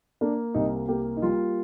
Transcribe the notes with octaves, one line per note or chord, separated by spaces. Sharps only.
A#3 D4
C2 D#4
A#3 G4
D#4
G3 F4